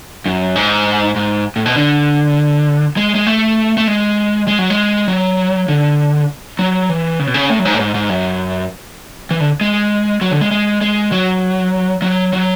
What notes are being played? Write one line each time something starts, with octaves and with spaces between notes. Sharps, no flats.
F#2
G#2
G#2
A2
B2
D3
G#3
G#3
A3
A3
G#3
G#3
F#3
G#3
F#3
D3
F#3
E3
C#3
B2
C#3
A2
F#2
G#2
A2
G#2
G#2
F#2
E3
D3
G#3
F#3
D3
G#3
G#3
G#3
F#3
F#3
F#3